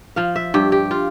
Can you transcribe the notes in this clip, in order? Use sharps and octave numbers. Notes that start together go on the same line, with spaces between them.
F3 F5
E5
G2 G4
G4
F4